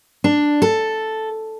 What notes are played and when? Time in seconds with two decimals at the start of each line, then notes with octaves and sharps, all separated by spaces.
0.24 D4
0.62 A4